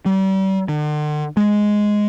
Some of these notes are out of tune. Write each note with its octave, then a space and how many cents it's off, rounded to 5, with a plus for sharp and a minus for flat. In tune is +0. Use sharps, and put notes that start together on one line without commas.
G3 -35
D3 +45
G#3 +5